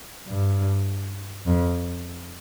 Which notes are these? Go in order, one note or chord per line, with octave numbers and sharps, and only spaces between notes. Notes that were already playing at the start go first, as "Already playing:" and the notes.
G2
F2